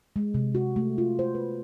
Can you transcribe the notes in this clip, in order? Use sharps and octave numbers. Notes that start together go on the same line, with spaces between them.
G#3
C3
F#4
A3
F4
C5
B4